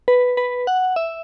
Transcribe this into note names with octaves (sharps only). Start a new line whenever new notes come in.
B4
B4
F#5
E5